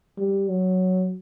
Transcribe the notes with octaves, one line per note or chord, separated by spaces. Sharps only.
G3
F#3